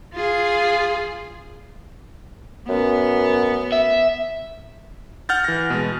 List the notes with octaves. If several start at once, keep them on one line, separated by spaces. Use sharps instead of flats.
F4 G#4
F#2 B3
E5
F#5 F6 G6 A6
E3 A#6
B2 G#3